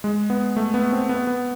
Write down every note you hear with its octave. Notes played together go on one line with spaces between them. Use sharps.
G#3
B3
A3
B3
C4
B3
B3